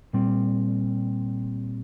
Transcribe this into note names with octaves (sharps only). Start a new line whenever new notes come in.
A#2 G3 C4